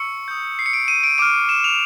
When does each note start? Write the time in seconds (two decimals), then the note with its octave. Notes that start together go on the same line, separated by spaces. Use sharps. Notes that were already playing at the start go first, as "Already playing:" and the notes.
Already playing: C#6 E6 C#7
0.28 D#6 G6
0.59 C7
0.66 C#7
0.73 D7
0.88 D#7
1.04 D7
1.18 D6 F6 D7
1.49 E7
1.64 F7